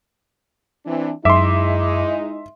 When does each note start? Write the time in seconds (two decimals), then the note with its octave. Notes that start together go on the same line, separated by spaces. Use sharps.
0.85 E3 C4 D4
1.25 F#2 G#3 D#4 E4 E5 C6 D6